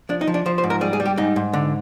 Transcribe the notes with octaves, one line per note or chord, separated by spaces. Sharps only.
F3 D4
D#4
F3
D4
F3 C5
C5
G#2
A#4
G3 G#4
G#4
G3
G4
G#2 D#4
G#2
D3